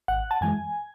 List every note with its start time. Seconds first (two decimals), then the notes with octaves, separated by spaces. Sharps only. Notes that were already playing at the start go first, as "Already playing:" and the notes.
0.08 G#1 F#5
0.31 A5
0.41 F#2 E3 G#3 G#5